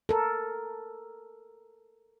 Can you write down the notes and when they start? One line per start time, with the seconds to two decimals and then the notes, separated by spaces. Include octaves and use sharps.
0.09 A4 A#4